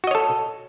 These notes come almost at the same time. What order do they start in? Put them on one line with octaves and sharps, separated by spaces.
F#4 D#5 C#5 A4